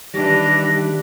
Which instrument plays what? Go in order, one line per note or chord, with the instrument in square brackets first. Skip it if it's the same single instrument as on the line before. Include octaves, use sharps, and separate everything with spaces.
[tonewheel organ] D#3 G3 [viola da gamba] E3 D4 [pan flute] G4 [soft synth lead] A#6